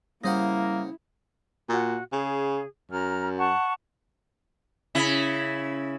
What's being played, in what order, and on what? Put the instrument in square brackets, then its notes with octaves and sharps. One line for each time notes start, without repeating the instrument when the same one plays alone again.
[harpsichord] C#3 C5 F#5 [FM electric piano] G3 D#6 A#6 [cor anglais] A#3 [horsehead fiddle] E4
[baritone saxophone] A#2 [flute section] F#4
[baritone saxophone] C#3 [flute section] G#4
[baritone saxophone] F#2 [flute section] A#5 F6
[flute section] F#5 A5 C#6
[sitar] C#3 E4